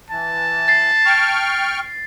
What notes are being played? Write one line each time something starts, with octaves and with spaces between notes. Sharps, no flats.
E3 A5
A6 C7
G5 C#6 F6